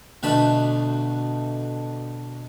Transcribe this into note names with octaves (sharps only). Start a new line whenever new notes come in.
D2 B2 D3 A3 A5 B5